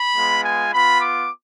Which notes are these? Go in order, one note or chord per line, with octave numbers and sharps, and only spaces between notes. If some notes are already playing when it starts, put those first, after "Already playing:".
Already playing: B5
G#3 B3 F4
G#5
B3 F4 B5
D6